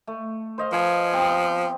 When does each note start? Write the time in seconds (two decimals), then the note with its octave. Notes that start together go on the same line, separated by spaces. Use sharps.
0.07 A3
0.58 C5 D#5 F5
0.72 F3 B4 G#5
1.12 B3 C4 G4